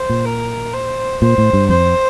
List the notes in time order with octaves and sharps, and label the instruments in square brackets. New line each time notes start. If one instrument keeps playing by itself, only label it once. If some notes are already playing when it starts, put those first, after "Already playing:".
Already playing: [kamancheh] C5
[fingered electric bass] A#2
[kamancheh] A#4
C5
[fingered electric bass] A#2 [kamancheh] C5
[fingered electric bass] A2
G2
[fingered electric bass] F2 [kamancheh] C5